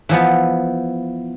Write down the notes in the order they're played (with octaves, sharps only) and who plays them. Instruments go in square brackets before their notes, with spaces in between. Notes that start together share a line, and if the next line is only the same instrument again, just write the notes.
[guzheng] E3 F3 B3